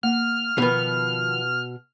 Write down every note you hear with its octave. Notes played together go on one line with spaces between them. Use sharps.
A#3 F#5 F6
B2 D#3 F3 B3